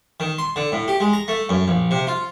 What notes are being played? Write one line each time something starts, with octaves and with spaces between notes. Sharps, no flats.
D#3
C6
D3
A2
G4
G#3
A#5
A3
F#2
A#1
C3
F4